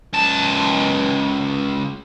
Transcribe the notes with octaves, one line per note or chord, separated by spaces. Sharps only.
C#2 A5